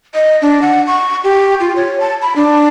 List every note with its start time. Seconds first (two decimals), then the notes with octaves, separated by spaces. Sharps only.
0.14 D#5
0.42 D4
0.62 F#5
0.87 C#6
1.24 G4
1.60 F4
1.76 C#5
2.00 A5
2.22 B5
2.36 D4